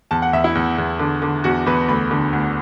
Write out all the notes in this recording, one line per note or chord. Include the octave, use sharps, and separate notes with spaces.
E2 A5
F#5
E2 E5
E4
E2
E2
D3
D3
E2 F#4
E2 B4
D2 B5
D3
D2